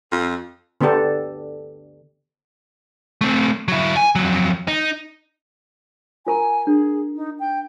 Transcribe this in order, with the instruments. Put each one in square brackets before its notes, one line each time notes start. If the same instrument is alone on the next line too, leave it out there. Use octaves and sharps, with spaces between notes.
[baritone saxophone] F2
[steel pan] D3 B3 D4 G4 A4
[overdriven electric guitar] A3 C4
F#3 E4
G#5
F2 F#3
D#4
[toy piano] F4 A#4 A#5 [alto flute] G#5
[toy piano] D4 [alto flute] G#4
[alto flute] D#4
G5